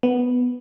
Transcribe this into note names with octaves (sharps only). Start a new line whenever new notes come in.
B3